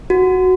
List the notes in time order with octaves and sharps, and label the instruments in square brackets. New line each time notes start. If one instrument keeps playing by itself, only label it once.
[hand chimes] F#4